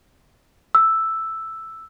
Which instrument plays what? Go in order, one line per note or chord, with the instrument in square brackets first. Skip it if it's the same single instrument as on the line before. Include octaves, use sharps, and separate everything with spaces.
[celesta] E6